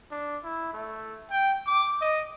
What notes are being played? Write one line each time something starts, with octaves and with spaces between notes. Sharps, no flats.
D4
E4
A3
G5
D6
D#5